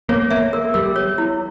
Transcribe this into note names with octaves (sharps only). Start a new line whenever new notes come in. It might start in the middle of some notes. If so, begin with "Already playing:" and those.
A#3 C#5
A#3 E5
A#4
G3 A#4
C#5
E4